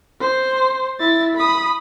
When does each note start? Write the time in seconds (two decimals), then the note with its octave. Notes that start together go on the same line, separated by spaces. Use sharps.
0.20 C5
1.00 E4 A6
1.35 B5 D#6